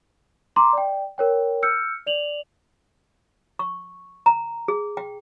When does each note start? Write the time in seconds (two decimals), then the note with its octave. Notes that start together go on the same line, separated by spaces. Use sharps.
0.56 A#5 C6 D6
0.73 D5 G5
1.18 A#4 C#5 G5
1.63 E6 F6 G6 C#7
2.06 D5 F7 F#7
3.59 C#6
4.26 A#5
4.68 G#4
4.97 G5